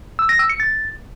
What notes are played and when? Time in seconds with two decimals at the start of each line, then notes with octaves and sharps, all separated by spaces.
0.19 E6
0.29 A#6
0.39 E6
0.50 C#7
0.60 A6